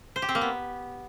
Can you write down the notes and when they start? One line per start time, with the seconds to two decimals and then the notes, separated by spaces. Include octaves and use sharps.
0.16 C5
0.22 G4
0.29 C4
0.35 A#3
0.41 B3